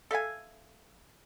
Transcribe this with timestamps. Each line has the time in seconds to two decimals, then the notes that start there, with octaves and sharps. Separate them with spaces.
0.11 A4 E5 F5 G#5